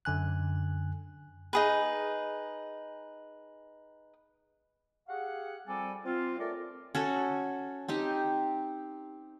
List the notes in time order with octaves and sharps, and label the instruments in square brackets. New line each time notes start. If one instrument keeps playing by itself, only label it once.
[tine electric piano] F#2 D3 G#5 F#6
[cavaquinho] D#4 G#4 B4
[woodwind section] G4 G#4 F5 F#5
F3 G3 C4 A4 D5 G#5
C4 F4
A3 A#4 C#5 D5
[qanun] C#4 F#4 A4
C4 D#4 G4